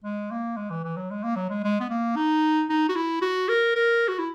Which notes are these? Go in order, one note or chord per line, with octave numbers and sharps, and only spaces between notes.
G#3
A#3
G#3
E3
E3
F#3
G#3
A#3
F#3
G#3
G#3
B3
A#3
D#4
D#4
F#4
E4
F#4
A#4
A#4
F#4
E4